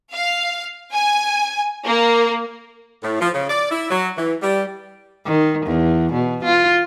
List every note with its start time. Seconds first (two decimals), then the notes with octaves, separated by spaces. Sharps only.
0.12 F5
0.93 G#5
1.87 A#3
3.03 A2
3.21 F3
3.34 C#3
3.50 D5
3.71 E4
3.90 F#3
4.18 E3
4.42 G3
5.25 D#3
5.66 E2
6.13 B2
6.44 F4